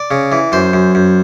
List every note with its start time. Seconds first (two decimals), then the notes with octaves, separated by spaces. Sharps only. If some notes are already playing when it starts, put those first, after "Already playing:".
Already playing: D5
0.11 C#3
0.32 E3
0.52 F#2 C5
0.73 F#2
0.95 F#2